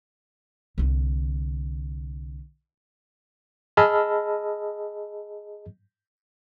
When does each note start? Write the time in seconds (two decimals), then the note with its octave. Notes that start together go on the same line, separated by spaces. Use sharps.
0.78 C2 D3
3.77 G#4 D#5 A5 B5 E6 F6